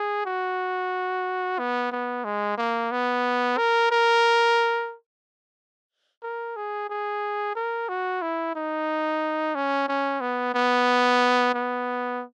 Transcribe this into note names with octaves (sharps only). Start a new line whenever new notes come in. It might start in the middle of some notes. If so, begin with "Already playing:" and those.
Already playing: G#4
F#4
B3
B3
G#3
A#3
B3
A#4
A#4
A#4
G#4
G#4
A#4
F#4
E4
D#4
C#4
C#4
B3
B3
B3